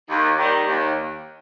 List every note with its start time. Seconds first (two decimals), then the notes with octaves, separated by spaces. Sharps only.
0.09 D#2
0.39 D#3 G3
0.68 D#2